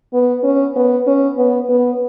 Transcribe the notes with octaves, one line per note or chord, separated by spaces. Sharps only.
B3
C#4
B3
C#4
B3
B3